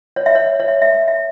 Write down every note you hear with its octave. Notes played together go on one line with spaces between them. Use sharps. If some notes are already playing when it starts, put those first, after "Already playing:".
C#5
E5
C#5
C#5
E5
E5
E5
E5